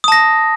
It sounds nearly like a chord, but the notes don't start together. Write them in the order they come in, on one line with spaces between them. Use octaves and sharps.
D#6 A5 A#6